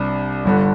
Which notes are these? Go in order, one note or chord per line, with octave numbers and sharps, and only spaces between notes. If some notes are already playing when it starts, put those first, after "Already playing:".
Already playing: C2 C3 G3 D4
G1 G2 D3